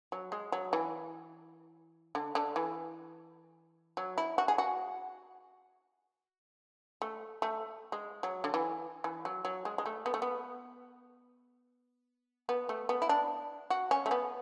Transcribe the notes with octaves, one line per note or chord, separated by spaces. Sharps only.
F#3
G#3
F#3
E3
D3
D3
E3
F#3
E4
F#4
G#4
F#4
A3
A3
G#3
F#3
D3
E3
E3
F#3
F#3
G#3
G#3
A3
B3
A3
B3
B3
A3
B3
E4
D4
F#4
C#4
A3
B3